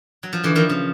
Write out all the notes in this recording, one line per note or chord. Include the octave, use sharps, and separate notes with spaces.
F#3
F3
D3 E3
D#3 F3
C#3